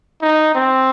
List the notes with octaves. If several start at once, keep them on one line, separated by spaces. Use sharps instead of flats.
D#4
C4